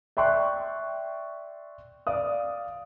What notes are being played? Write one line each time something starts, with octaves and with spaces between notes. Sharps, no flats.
D5 E5 G5 C6 C#6 F#6
D5 F5 D#6